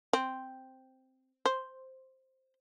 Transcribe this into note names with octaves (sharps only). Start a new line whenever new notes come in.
C4
C5